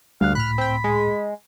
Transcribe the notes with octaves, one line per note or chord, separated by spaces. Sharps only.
D2 G3 F5 F#6
C#2 A2 B5 F6 F#6
C4 G5
G#3